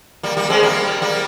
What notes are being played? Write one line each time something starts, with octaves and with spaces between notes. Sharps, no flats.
G3 A#3
G3 A#3
G#3 C4
G3 A#3
G3 A#3